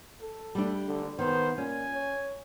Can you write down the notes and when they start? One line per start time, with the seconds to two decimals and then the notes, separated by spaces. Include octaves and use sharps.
0.22 A4
0.55 G3 A3 D4
0.88 D3
1.19 D#3 B3 C5
1.58 A#2 C#4 G#5
1.94 C#5